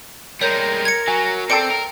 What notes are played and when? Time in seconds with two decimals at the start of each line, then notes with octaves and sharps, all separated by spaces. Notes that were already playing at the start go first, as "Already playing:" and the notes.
0.41 G3 G#3 A#4 C#5 G6
0.85 G#6 C#7
1.08 F#3 G#5
1.50 C4 A4 D5 G5 C#7
1.71 A#4